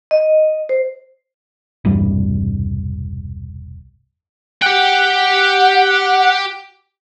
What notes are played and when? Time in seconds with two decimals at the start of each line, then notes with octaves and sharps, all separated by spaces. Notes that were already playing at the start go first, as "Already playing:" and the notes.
0.11 D#5
0.69 C5
1.85 E1 C2 G2 G3
4.62 G4 F#5 G5